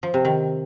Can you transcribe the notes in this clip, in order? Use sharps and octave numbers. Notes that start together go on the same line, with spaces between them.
F3
C3
D#3